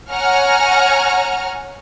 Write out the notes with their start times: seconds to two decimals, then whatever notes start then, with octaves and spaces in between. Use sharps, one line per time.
0.11 C#5 F#5 G#5 A#5 F6